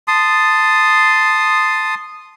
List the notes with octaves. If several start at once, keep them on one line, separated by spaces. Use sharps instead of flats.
A5 C6 D#6